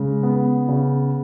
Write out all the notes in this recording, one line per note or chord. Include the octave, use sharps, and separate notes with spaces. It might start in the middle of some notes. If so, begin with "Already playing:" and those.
Already playing: C#3 G#3
B3
C#3